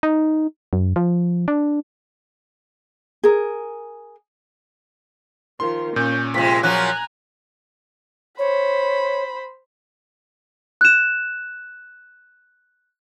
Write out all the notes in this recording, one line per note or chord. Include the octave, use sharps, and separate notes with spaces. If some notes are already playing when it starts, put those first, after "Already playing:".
D#4
F#2
F3
D4
G#4 A#4
D#3 F3 C6
A#2 C#4 G6
C3 F3 G#3 B6
F3 F#3 C#4 G#5 A#5 F#6
C5 C#5 B5
F#6 E7